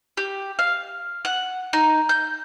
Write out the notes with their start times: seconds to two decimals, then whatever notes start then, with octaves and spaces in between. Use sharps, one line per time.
0.17 G4
0.59 F5
1.25 F#5
1.73 D#4
2.09 G6